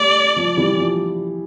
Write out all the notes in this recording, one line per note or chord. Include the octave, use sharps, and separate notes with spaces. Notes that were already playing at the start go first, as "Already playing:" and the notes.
Already playing: G3 A3 D5
F3
E3 G3
F3